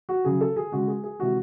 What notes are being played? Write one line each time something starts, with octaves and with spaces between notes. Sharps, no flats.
F#4
C#3 F#3 G#4
A4
G#4
C#3 G#3 F#4
G#4
G#4
C3 E3 G#3 F#4